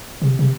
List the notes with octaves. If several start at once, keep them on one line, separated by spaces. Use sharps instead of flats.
C3
C3